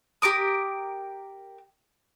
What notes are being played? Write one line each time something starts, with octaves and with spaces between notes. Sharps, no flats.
G4 A#4 D6 D#6